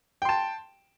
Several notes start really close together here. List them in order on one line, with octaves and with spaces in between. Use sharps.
G5 C6 A5